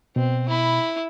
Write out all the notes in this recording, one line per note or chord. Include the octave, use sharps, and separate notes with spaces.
B2 C4
E4 B5